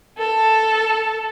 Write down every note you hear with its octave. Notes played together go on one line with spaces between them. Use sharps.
A4